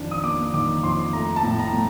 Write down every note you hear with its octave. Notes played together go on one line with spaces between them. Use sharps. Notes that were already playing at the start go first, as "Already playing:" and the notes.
Already playing: F2 D#3 D4
D#6
A#3 D6
D#3 D6
F2 C6
A3 A#5
A5
A2
A#5
A2